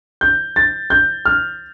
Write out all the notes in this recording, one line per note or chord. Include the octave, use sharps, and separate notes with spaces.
G6
A6
G6
F6